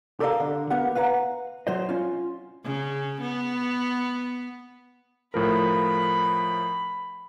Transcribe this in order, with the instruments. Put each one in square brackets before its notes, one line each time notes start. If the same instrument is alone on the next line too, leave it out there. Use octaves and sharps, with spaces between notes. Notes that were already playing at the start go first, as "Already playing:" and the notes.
[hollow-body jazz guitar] G4 A4 A#4 D5 D#5 F5
D3
A#3 B3 G4 B4 F#5
B4 F5 F#5 A#5
F#3 C5 D#5
C#4 F4
[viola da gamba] C#3
B3
[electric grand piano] A2 F3 A#4 [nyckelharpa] B5